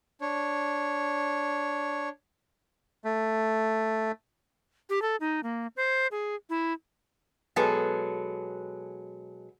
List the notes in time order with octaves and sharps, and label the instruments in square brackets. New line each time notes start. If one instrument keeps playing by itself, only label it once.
[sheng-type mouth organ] D4 C#5
[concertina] A3
[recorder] G4
A4
D#4
A#3
C5
G#4
E4
[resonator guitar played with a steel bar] B2 F#3 G#3 B3 G#4 A4